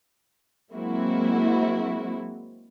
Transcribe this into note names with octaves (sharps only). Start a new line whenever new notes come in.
F#3 G#3 A#3 C4 E4 F#4